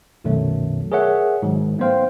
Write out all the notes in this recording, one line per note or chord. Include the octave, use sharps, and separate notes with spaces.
C2 F#2 B2 D#3 F#3 A3
G#4 A#4 C#5 E5 F#5
G#2 D#3 F#3
A3 B3 D#4 C5 F5 G5